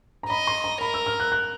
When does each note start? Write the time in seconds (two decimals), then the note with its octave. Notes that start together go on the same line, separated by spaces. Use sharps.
0.23 A#5
0.30 D#5 B5
0.47 C6
0.64 A#5
0.81 A#4 B5
0.94 E6
1.06 F6
1.20 F#6
1.32 F#6